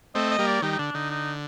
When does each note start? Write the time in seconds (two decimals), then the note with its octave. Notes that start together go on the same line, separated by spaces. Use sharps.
0.15 A3 C4 D#5
0.30 D#5
0.39 G3 A#3
0.47 D5
0.62 D#3 G3 D#4
0.72 D#4
0.79 D3 D4
0.94 D3 D#4
1.11 D#4